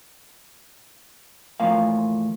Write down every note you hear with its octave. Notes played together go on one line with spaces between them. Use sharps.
E2 A2 F3 A#3 F5